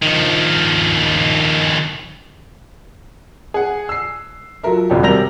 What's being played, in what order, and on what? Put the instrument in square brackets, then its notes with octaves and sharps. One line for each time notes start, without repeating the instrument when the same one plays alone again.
[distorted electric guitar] D#3 F3
[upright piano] G#4 F#5
E6 C7
F#3 F4 A4 A#4 E5
D#1 C2 F#2 G4
C3 G3 A#4 G6 A#6 F7